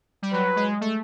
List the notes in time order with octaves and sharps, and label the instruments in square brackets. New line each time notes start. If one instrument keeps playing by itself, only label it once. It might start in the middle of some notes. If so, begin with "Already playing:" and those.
[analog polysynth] G3
[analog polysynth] F#3 [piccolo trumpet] B4
[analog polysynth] G#3
A3